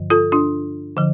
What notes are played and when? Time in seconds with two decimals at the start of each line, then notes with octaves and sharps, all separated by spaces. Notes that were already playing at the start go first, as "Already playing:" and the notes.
Already playing: G2 D3 F3
0.10 F4 A4
0.32 D4 F4
0.97 D3 F3